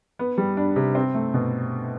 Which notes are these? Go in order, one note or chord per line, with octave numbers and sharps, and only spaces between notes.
B3
G3
D4
C3
C4
A3
B2